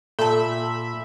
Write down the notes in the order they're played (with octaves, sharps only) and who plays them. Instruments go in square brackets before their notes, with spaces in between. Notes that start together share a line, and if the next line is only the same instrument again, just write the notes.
[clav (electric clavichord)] A#2 [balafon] A4 A5 [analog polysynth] E5 B5